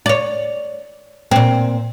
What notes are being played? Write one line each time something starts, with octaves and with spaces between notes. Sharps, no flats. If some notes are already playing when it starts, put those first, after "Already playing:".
C#5 D5
A#2 C4